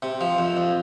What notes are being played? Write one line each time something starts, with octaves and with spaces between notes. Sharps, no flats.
C3
F3
F2
F2